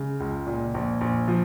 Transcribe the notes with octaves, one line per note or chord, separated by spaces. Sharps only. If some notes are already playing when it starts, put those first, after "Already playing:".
Already playing: C#3 G#3
C#2
A#2
A#1
A#1
F3